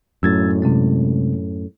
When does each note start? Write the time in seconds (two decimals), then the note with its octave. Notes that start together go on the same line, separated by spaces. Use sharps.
0.23 F#2 A2 E6 G#6 A6
0.62 C3 G#3 C4